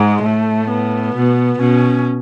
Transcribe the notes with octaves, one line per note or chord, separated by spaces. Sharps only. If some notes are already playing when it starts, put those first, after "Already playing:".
Already playing: G#2 G#3
A2 A3
B3
B2
B2 C#4